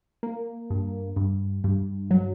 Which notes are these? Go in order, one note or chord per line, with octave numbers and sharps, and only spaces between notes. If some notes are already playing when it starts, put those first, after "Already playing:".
A#3
G2
G2
G2
F#3